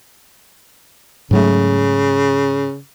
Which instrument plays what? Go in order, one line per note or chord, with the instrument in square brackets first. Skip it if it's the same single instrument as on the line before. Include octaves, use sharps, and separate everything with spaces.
[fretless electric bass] G#2 F#3 A3 [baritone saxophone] C#3